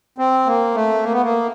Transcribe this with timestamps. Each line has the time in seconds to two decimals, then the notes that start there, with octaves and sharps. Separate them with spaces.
0.18 C4
0.46 A#3
0.75 A3
1.03 A#3
1.12 B3
1.23 A#3